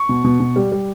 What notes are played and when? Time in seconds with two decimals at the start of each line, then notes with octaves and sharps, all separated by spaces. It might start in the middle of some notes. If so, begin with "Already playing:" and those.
Already playing: C#6
0.09 B2
0.24 B2
0.40 B2
0.56 G3
0.72 G3